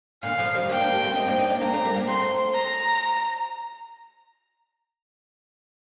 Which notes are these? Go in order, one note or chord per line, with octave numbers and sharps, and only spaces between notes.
A#2 D3 F5
D3 F3
D#3 G3
A#3 D4 G5
A#3 D4
G3 A#3
A3 C4
C4 D#4
A#3 D4
C4 D#4
A#3 D4
A#3 D4 A#5
A3 C4
G3 A#3
A#3 D4
A3 C4 C6
A#5